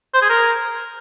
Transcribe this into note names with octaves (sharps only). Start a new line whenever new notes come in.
C5
G#4
A#4